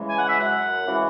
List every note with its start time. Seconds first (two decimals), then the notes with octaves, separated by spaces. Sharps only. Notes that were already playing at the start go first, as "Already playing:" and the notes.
Already playing: C#3 E3 G#3
0.08 G#5
0.18 F#5
0.28 E5
0.37 F#2 F#5
0.86 C#3 E3 G#3